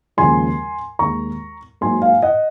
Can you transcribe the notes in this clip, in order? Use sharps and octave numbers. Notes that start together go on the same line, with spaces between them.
D#2 C#3 F3 G#3 G#5 C6
D#2 D#3 G#3 A#5 C#6
G#2 F#3 A#3 G#5 C6
F5 G#5
D#5 F#5